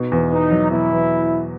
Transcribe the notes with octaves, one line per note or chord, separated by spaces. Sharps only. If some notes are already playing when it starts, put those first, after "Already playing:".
Already playing: B2 D#4
E2
B3 D#4
F#3
B2 E4
E2